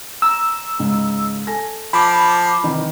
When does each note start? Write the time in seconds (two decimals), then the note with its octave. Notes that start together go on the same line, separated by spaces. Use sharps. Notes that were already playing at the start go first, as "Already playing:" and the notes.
0.22 A#5 E6
0.79 C#2 G#2
1.47 A4 G#5 A#6
1.93 F3 B5 D6
2.63 C2 D#3 E3